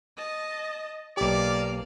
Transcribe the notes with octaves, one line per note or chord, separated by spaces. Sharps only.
D#5 A5
B1 A#3 G4 D5 F5